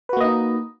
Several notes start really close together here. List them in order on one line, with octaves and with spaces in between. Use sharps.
B4 F#4 A#3 D#5 D#4